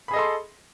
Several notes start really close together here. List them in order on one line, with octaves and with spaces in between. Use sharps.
B5 G#4 D#5 A4 C6